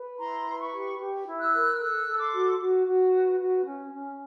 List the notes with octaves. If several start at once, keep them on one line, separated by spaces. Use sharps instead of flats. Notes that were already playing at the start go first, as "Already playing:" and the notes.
Already playing: B4
E4 A#5 C6
B4
B5 C#6
G4
G4
E4
E6 F#6
A#4
F6
A4 E6 F#6
A4
C6 D6
F#4
F#4
F#4
B4
F#4
C#4
C#4